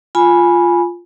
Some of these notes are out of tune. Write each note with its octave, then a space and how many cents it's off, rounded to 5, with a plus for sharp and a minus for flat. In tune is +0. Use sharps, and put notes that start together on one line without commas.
F4 +0 G#5 +0 B5 -15